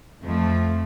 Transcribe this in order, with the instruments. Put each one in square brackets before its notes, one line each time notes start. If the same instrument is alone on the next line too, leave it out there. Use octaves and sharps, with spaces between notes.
[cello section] F2 F3 A3